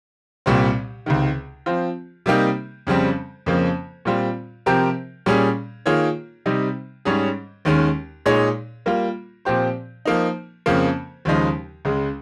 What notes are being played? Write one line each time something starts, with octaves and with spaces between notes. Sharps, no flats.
C2 A#2 G3 C4
C#2 C3 D#3
F3 C4 F4
C3 G3 A#3 D#4 G4
F2 C#3 G3 C4
F2 C#3 F3 A#3
A#2 G3 C4 F4
C3 F3 C4 G4 A#4
A#2 G3 C#4 G#4
D#3 A#3 F4 G#4 C#5
C3 G3 C4 D#4
G#2 G3 C#4 G#4 C#5
D#2 D#3 G#3 C#4
A#2 G#3 D#4 G#4 C#5
G3 A#3 F4
A#2 F3 C4 G4 C5
F3 A#3 D#4
F2 C#3 F3 A#3
D#2 C#3 F3 G#3 D#4
C#2 C#3 G#3